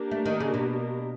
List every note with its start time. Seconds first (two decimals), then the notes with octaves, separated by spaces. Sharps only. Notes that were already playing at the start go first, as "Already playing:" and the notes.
Already playing: A#3 D4 G4 A#4
0.11 A3
0.26 D#3
0.40 C#3
0.54 B2